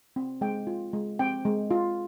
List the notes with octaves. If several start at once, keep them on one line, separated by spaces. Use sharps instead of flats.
C4
G#3 G5
F4
G#3
C4 G5
G#3
F4